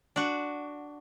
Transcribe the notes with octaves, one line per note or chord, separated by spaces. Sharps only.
D4 F#4